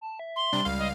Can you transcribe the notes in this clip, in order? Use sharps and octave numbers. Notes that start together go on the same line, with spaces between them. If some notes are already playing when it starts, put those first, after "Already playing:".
A5
E5
C6
C3 G3 D4
C#2 F5
D#5